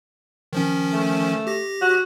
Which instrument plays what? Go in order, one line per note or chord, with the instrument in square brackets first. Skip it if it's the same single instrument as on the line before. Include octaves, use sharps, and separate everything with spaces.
[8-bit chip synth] D#3 F3 C#4
[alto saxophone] A3
[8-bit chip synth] G4 A#6
[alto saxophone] F#4